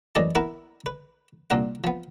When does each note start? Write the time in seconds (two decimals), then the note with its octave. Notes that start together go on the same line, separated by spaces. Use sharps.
0.15 F#2 A2 E3 D5 D#5 A5
0.35 B3 E4 A#4 B4 E5
0.86 B4
1.50 C2 A#2 D4 A#4 F#5
1.84 F3 B3